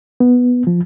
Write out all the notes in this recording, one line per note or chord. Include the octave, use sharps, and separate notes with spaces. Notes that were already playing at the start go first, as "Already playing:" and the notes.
B3
F3